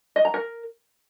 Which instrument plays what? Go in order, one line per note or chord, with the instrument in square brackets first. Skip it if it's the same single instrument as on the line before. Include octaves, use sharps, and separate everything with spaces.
[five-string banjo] D#5
A#5
A#4